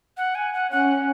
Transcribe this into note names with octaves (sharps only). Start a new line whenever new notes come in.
F#5
G#5
F#5
C#4 F#5